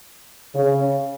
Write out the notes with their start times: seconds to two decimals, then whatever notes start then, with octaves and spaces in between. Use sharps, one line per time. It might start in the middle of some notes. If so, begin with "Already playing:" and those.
0.55 C#3